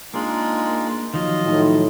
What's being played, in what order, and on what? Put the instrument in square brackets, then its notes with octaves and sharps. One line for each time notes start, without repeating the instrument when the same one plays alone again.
[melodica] G#3 D#4 F4 [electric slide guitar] A#3 D4
[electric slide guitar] D#3 F3 F#3 [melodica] F4 D#5
[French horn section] A2 D#4